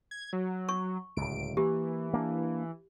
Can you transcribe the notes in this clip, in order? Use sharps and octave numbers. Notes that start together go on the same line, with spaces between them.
G#6
F#3
C#6
D1 C#2 D7
E3 A#3 G4
A#3 D4